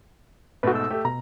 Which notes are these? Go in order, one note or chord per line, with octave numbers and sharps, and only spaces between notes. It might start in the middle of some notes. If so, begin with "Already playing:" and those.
G#2 B2 A3 F#4 B4
E6
A3 G4
B2 A#5